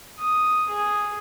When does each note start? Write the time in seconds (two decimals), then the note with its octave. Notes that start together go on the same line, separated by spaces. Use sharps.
0.18 D#6
0.69 G#4